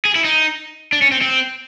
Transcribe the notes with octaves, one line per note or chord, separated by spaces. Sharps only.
G#4
E4
D#4
D4
C#4
C4
C4